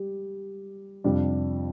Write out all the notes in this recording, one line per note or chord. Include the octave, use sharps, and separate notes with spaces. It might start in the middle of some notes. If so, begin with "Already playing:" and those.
Already playing: G3 G4
F2 C3 G3 D4